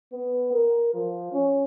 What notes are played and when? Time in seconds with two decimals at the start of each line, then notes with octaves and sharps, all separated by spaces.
0.13 B3
0.53 A#4
0.94 F3
1.32 C#4